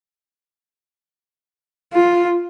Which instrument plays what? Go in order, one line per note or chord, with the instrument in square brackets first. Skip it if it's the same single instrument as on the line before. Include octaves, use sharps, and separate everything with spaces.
[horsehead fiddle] F4